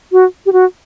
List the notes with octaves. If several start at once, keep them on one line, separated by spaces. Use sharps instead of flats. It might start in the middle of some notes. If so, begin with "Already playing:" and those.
F#4
G4
F#4